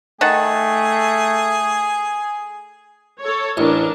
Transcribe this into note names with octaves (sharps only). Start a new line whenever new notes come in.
D#3 A3 G#4 F#5 A5
A4 C#5
A1 D4 A#4